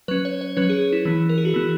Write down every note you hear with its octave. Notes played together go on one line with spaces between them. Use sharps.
F#3 C#4 B4
C#5
C#5
F#3 C#4 B4
G#4
E4
E3 B3 E4
A#4
G#4
F#4
E3 B3 E4